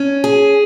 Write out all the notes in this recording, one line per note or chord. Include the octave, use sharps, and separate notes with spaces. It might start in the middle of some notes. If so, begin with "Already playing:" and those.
Already playing: C#4
G#4